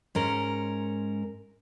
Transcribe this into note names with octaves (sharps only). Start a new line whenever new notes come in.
G#2 C#4 A#4